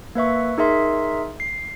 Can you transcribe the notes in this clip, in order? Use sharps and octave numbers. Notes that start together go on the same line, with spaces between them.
A#3 B4 E5 C#6
D#4 G#4 A#4 E5 C6
C7